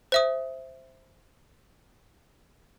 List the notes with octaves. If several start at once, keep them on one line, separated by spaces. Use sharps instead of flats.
C5 E5 D#6